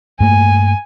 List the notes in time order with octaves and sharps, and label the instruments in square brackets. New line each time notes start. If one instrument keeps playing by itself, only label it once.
[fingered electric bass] G2 A3 A#3 [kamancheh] G#5